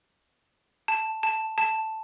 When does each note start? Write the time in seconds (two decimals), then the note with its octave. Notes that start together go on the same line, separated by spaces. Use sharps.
0.88 A5
1.23 A5
1.58 A5